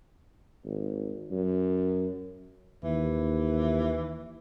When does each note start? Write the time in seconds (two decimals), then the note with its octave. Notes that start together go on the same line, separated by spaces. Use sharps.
0.65 G#1
1.31 F#2
2.84 D#2 E3